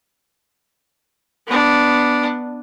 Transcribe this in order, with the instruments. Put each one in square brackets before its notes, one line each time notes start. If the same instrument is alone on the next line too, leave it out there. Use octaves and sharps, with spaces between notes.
[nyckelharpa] B3 D4